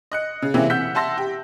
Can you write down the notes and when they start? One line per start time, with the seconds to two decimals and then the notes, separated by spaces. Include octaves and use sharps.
0.12 D#5 F#6 C#7
0.42 C#3
0.54 C3 E3 A#3 C4 C#4 E4
0.70 F#5 E6 G6 B6
0.95 E5 F#5 A5 C6 E6 A#6
1.18 G4